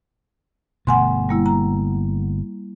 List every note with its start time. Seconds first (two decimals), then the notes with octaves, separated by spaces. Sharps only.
0.87 G1 B2 A3 F#5 G#5 C6
1.29 G3 A#3 E4
1.46 A#5